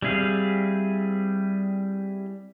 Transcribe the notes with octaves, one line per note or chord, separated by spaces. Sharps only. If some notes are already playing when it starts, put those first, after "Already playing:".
G3 C4 E4 G#4 F5